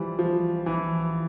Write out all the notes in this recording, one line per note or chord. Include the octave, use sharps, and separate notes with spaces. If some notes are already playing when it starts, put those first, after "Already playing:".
Already playing: E3 F3 G3
F3
E3